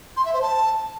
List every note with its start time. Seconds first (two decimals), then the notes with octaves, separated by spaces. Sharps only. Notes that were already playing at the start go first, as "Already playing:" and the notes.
0.17 C6
0.25 E5
0.33 C5
0.42 A5